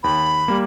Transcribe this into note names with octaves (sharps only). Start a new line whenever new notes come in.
D#2 B5
G3 A#3